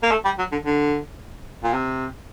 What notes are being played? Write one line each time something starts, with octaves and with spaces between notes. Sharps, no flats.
A#3
A3
G3
F#3
D3
D3
A#2
C3